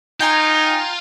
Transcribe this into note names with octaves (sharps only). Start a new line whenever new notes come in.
D#4 F4 G5 G#5 A#5